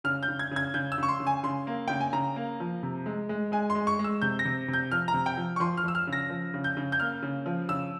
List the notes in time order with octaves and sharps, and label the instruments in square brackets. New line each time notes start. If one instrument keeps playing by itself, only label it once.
[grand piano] C#3 F6
G6
C#3
G#6
C#3 G#6
C#3 G6
E6
C#3 C#6
C6
C#3
G#5
C#3 C6
A#3
C#3 G5
G#5
C#3 A#5
A#3
F3
C3
G#3
G#3
G#3 G#5
C6
G#3
C#6
G#3
E6
C3 G6
A#6
C3
C3
G6
F3 F6
A#5
C3
G5
F3
C#6
F3 C6
F6
F3 E6
F6
C#3
A#6
F3
C#3
G6
C#3
G6
A#3 F6
C#3
F3
C#3 E6